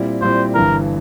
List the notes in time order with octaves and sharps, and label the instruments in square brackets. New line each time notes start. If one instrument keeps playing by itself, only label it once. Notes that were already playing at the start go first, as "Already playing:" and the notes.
Already playing: [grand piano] A#2 G3 C4 E4
[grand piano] A#2 G3 C4 E4 [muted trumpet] C5
[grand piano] G1 G2 E3 [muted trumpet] A#4